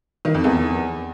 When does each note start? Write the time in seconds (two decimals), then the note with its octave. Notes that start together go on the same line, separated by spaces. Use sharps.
0.25 D#3
0.34 F2
0.44 E2